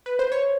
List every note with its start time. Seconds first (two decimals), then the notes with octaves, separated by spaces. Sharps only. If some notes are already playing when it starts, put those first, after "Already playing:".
0.06 B4
0.19 C5
0.32 C#5